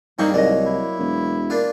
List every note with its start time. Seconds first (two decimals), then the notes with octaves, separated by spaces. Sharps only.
0.19 G2 A#3 C4 D#4 G4 C#6
0.34 C2 G#2 F#3 A#3 D5 D#5
0.66 E4
0.99 E1
1.50 A#3 D4 F4